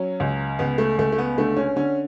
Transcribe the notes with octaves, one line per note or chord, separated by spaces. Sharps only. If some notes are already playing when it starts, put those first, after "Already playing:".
Already playing: F#3 C#4
C#2
C#2 B3
A3
C#2 A3
A3
B3
D3 A3
C#4
D3 C#4